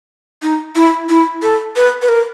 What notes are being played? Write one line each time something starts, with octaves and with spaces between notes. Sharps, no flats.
D#4
E4
E4
A4
B4
B4
A#4